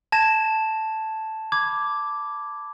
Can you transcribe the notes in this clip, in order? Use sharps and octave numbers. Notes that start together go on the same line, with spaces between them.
A5 G#6 A#6 E7
B5 D6 G#6